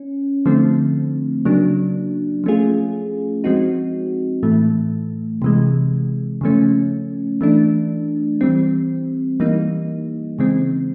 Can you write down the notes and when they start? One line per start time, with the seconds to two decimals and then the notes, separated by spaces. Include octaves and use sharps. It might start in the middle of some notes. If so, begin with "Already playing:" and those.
Already playing: C#4
0.46 D3 F3 A3 C4
1.45 C#3 F#3 A#3 D4
2.44 F3 A3 C#4 F4 G#4
3.44 F3 G#3 C4 D#4 F#4
4.43 A2 E3 A3
5.42 C3 E3 G#3
6.41 C#3 F3 A3 C#4
7.41 E3 A3 D4
8.41 E3 G3 C4
9.40 E3 G3 A#3 D#4
10.39 C#3 E3 G#3 C4